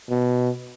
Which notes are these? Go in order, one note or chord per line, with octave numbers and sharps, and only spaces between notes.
B2